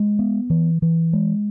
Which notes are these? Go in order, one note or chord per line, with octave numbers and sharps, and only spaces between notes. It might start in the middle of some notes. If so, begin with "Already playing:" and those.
Already playing: G#3
B3
E3
E3
G#3